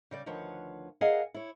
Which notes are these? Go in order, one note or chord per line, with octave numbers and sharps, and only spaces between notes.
C#3 G3 D5
D2 D#3 F3 B4 C#5 F#5
G#4 A#4 D#5 F5 F#5 G#5
E4 C#5